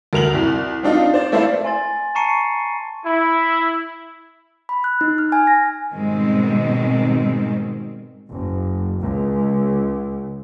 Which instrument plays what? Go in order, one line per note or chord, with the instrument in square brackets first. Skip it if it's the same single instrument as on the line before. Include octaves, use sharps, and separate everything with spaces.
[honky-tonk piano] D2 A#4 F7 F#7
C2
C4 D4 D#4 F4
C5 D5
A3 E4 C5 D5 F5
[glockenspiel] G#5 C6 A6
A5 A#5 C#6 C7 C#7 D#7
[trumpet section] E4
[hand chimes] B5
F#6
D#4
F6
G#5
A#6
[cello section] G#2 B2 D#3 G3 G#3 C4
[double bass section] F#1
C#2